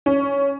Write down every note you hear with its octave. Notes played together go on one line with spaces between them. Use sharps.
C#4